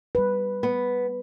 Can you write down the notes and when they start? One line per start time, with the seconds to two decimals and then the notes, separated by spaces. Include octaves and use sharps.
0.15 G3 B4
0.63 B3